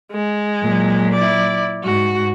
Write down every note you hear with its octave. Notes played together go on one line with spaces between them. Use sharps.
G#3
A#2 F#3
E4 D5
G#2 F#4